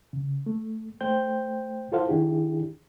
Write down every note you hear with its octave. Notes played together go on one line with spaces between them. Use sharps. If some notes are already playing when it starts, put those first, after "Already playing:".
C#3
A3
A3 C5 G5 G6
E4 F4 A4 C5 F5 F#5
D#3 D4 E4 G4 G#4